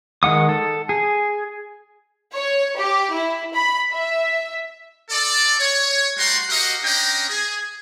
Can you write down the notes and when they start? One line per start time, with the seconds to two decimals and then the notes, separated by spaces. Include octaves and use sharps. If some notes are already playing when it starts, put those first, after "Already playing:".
0.23 D#3 G#3 F#5 D#6
0.49 A4
0.89 G#4
2.33 C#5
2.78 G4
3.14 E4
3.55 B5
3.93 E5
5.10 A4 D5
5.59 C#5
6.17 G3 A3 F#4 F#5 A#5 C6
6.49 F#4 G4 A#4 D#5 F5 F#5
6.84 C#4 D4 D#5 G5 A#5
7.29 G#4